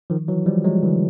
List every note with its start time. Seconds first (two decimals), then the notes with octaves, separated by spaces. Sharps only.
0.10 D#3 F3
0.28 E3 F#3
0.46 F3 G3
0.64 F#3 G#3
0.83 D3 E3